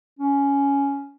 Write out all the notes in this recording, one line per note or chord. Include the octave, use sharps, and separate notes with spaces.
C#4